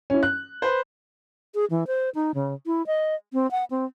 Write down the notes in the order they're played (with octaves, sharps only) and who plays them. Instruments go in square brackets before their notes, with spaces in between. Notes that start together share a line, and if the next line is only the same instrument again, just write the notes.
[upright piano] C#4 E4
F#6
[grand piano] B4 C5
[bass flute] G#4
E3
C5
D#4
C#3
E4
D#5
C4
F#5
C4